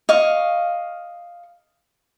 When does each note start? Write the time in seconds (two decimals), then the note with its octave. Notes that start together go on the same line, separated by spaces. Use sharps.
0.09 D#5 F5 C#6